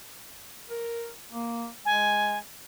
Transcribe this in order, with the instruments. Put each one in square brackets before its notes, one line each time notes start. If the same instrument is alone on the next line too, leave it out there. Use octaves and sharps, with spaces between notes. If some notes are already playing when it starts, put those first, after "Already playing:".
[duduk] A#4
A#3
[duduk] G#3 [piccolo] G#5